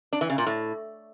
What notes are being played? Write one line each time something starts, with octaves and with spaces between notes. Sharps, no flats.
D4
E3
C#3
A#2
A2